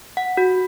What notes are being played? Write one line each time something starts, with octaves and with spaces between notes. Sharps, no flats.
F#5
F#4